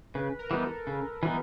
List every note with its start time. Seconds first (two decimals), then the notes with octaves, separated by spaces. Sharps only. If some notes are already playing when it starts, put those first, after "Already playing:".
0.14 C#3 B4
0.39 A#4
0.51 E3 G3 B3 D#4
0.62 A4
0.87 C#3 A4
1.23 E3 G3 B3 D#4